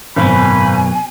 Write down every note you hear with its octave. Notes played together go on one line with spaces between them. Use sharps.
G#1 F#2 B2 B3 G#5 B5